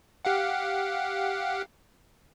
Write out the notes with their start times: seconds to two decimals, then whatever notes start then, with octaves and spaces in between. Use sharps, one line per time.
0.25 G4 F5 F#5